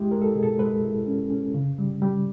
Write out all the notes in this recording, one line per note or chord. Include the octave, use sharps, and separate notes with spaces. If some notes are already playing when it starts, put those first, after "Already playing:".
Already playing: G#3 E4 G4
G#3 A#4
A4
B2 G#4
A4
G#3 B4
E4
C#4
C#4
C#3
G3
G3